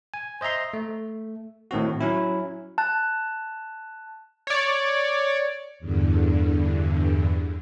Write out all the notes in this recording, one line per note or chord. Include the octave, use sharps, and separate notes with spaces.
G#5
C5 D#5 E5 A#5 C6
A3
A2 D#3 C4 F#4
F#3 C#4 E4
A5 F#6
C#5 D5
E2 G2 D3